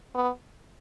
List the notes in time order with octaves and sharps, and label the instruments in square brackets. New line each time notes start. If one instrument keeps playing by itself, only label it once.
[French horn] B3